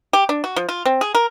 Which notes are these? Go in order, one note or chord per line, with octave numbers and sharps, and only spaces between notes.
G4
D4
F#4
F3
F4
C4
G#4
A#4